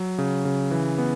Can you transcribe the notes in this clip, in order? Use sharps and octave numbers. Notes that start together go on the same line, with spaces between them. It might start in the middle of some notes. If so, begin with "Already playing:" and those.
Already playing: F#3
C#3
C#3
E3
B3